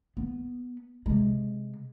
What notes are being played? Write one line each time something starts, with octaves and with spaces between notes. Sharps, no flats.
B3
C3 G#3